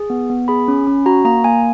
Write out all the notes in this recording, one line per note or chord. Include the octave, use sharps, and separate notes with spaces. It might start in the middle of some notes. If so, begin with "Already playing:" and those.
Already playing: G#4
B3
B3
G#4 B5
C#4
C#4
F#4 A#5
A#3 A#5
A#3 G#5